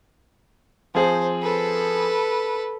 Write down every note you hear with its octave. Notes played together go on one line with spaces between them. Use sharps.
F3 C4 G#4 C5
A4 B4